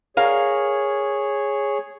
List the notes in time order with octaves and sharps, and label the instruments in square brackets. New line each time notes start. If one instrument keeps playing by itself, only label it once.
[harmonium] G#4 C#5 [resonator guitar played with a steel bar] A#4 F5